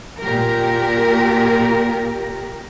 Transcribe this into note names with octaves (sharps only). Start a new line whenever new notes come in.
A#2 G4 A#4